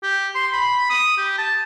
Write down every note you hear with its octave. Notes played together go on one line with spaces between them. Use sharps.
G4
C6
B5
D#6
G4
A5